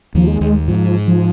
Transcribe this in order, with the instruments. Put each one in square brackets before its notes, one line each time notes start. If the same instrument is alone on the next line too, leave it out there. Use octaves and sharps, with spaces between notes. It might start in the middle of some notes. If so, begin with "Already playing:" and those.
[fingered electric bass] D#2 D#3 [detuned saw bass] F3
[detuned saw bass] G#3
[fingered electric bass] D#2 D#3
[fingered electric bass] G#2 G#3 [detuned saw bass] F3
[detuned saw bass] F3